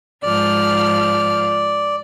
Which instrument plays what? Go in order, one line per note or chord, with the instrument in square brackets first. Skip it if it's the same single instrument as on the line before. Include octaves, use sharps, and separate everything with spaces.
[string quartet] G#2 F3 F6 [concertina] D5